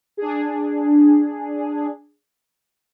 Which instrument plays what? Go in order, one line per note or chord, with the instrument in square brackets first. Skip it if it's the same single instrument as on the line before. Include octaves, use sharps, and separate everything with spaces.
[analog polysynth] D4 G#4